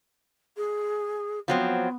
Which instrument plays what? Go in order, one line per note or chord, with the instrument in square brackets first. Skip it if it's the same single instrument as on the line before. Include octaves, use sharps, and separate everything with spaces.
[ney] G#4
[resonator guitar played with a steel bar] F3 F#3 C4 [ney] B3